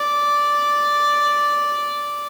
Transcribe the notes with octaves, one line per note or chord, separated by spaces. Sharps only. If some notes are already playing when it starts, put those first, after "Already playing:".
Already playing: D5